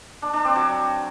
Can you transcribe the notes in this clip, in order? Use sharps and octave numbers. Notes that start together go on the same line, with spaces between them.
D4
D4
C4
F#3